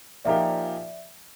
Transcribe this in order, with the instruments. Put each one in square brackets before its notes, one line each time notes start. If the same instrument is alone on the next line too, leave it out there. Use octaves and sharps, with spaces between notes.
[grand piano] A#2 F3 A#3 D#4 G4 [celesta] D5 E5